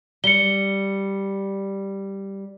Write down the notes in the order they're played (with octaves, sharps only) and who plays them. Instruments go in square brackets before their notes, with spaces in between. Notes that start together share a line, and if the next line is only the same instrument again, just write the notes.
[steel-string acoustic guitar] G3 [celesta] C#7 G7